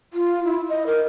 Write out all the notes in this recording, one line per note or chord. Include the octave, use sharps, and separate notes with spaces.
F4
E4
D#5
A#4